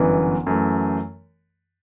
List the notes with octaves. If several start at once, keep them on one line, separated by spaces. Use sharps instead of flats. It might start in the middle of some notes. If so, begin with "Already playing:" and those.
Already playing: G1 F#2 E3 B3
F#2 E3 A3